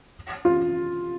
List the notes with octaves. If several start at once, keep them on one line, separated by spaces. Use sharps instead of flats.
F4